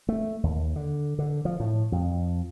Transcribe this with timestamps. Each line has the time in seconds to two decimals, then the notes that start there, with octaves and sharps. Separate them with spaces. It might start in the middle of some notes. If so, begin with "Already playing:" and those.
0.09 A3
0.43 D#2
0.76 D3
1.19 D3
1.45 F3
1.60 A2
1.92 F2